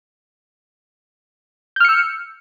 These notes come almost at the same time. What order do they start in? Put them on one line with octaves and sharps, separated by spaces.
G6 F6 C#7 E6